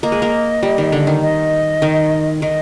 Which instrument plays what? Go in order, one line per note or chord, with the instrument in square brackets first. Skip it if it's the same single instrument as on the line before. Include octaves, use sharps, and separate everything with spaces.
[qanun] A#3 [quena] D#5
[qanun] G#3
A#3
G3
D#3
D3
D#3
[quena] D#5
[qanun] D#3
[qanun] D#3 [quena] D#5